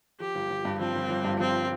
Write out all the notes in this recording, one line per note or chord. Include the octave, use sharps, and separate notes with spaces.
F3 G4
G1
G1
G2
F3 C4
G1
G1
G2
F3 C4